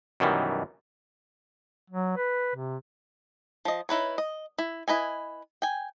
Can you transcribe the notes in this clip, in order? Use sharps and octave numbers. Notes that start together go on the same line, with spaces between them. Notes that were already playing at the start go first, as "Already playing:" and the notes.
F#2 B2 D#3 E3 G3
F#3
B4
C3
F3 D#5
D#4 E4 B4 C#5
D#5
E4
E4 B4 D#5 G#5
G5 G#5